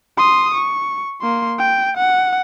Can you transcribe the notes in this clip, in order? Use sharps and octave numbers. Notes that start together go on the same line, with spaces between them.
C6 D#6
C#6
A#3 C6
G5
F#5